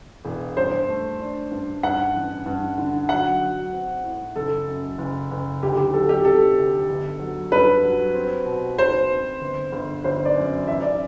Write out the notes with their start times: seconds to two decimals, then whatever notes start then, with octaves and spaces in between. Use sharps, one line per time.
0.25 E1
0.57 G2 C5
0.88 A3
1.19 D4
1.51 G2
1.83 G2 F#5
2.14 A1
2.46 G2
2.78 D3
3.09 F#3 F#5
3.42 F#3
3.73 C4
4.04 A2
4.36 F#1 A4
4.67 F#2
4.98 F#1
5.31 F#1
5.63 D2 G4
5.77 G4
5.93 F#3 A4
6.09 G4
6.25 C3 A4
6.58 D2
6.89 G1
7.20 F#3
7.52 G2 B4
7.83 F#3
8.14 C4
8.46 B2
8.77 C4 C5
9.10 C4
9.41 G1
9.72 G1
10.04 G1 C5
10.25 D5
10.36 F#2
10.67 A1 E5
10.82 D5